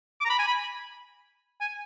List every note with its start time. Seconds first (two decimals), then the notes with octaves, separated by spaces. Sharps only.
0.20 D6
0.25 A#5
0.30 B5
0.39 G#5
0.48 B5
1.61 G#5